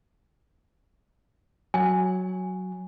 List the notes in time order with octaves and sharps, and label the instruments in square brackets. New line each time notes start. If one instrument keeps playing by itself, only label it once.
[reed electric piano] F#3 [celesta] G#5